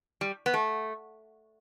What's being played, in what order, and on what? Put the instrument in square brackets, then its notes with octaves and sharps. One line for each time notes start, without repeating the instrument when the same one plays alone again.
[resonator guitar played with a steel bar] G3
B3
A3